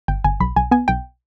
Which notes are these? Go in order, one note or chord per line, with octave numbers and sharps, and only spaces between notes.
G1 G5
G1 G#5
B1 B5
B1 G#5
B3 G#5
B1 G5